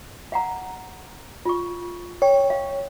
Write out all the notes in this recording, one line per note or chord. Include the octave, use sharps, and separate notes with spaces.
F5 F#5 A#5
F4 C#6
C#5 G5
F5